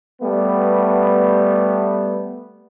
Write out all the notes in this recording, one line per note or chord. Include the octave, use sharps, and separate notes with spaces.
G3 A3 B3